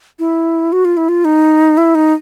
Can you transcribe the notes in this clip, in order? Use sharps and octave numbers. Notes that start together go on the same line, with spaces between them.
E4
F#4
F4
E4
F4
D#4
E4
D#4